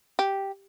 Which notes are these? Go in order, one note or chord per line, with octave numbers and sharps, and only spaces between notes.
G4